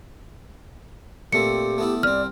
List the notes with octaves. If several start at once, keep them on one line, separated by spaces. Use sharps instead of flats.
A#2 A3 C4 G4 C#7
A3 B3 E4
C2 C4 D5 F6